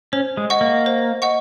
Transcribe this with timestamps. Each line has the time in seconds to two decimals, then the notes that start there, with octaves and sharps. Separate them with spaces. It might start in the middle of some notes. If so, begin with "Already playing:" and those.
0.13 C#4 C5
0.37 G#3
0.50 D#5 F#5 C#6
0.61 A#3
0.86 C5
1.22 D#5 F#5 C#6